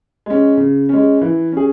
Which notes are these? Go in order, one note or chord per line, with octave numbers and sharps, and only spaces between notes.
G#3 C#4
C#3
G#3 C#4
E3
C#4 G#4